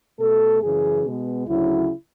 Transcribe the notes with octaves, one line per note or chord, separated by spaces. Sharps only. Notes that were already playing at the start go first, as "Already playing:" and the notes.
B2 A3 A4
F#2 C#3 E3 G#4
B2 G#3 B3
D2 C#3 F#3 E4